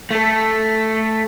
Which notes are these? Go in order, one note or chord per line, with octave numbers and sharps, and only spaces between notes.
A3 A4